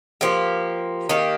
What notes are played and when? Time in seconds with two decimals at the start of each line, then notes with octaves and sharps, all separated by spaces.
0.21 F3 A#3 G4
1.09 D#3 A#3 G4